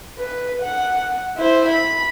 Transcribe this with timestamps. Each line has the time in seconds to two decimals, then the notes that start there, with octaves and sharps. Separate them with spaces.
0.17 B4
0.62 F#5
1.37 E4 C5
1.68 B5